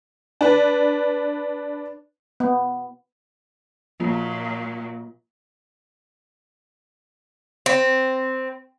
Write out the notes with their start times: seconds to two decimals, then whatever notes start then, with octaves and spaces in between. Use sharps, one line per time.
0.41 D4 B4
2.40 B3
4.00 A#2 F3 F#3 A#3 F4
7.66 C4